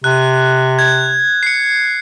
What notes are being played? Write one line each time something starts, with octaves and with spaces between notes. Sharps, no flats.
C3 F#6
G#6
C7 C#7